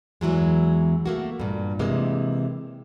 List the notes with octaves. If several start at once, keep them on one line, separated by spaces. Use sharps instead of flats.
E2 E3 F#3 G#3
A3 A#3 F#4
G2 A#2
C3 E3 G#3 A#3